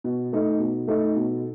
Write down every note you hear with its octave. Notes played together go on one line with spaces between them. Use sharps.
B2
A3 D#4 A4
B2
A3 D#4 A4
B2